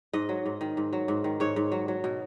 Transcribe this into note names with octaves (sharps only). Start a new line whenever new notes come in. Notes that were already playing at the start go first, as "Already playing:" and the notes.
G#2 D#5
F#3
G#2
D#3
G#2
F#3
G#2
D#3
G#2 C#5
G#2
F#3
F#3
B2